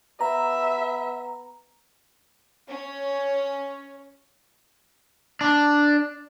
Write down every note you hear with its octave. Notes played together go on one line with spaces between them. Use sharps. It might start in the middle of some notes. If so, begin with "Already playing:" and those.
B3 E5 A#5
C#4
D4